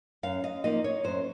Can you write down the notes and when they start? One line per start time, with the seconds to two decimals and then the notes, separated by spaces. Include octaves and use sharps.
0.23 F#2 F5
0.44 D#5
0.64 F3 A#3 D#4 D#5
0.84 C#5
1.04 F#2 C5